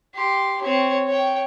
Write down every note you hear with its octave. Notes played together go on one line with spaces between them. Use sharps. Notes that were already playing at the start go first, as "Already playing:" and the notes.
G4 C6
C4 C#5
C#5 G5